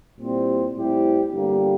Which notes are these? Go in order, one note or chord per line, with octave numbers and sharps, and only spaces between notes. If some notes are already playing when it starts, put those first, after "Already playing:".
A#2 G3 C4 E4
A2 G3 C4 E4 G4
G1 G2 D3 G3 A#3